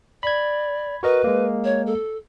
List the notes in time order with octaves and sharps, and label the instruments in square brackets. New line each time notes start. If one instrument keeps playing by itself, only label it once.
[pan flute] D5 [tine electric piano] B5 G#6
[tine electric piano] F#4 A#4 D#5 [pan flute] B4
[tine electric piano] G#3 A#3
[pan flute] C#5
A4